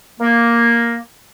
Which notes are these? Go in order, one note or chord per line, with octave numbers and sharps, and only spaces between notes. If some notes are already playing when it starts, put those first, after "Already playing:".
A#3